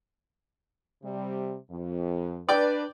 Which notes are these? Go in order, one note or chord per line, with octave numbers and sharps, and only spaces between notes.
C3 G3
F2
D4 B4 D5 G5 D6